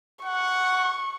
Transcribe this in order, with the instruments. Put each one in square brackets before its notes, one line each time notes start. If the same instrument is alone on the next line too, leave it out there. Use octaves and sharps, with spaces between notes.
[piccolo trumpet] F#5 [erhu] C#6